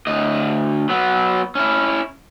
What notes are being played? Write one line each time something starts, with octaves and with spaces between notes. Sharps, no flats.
D2 D#5
F#3 B3
C#4 E4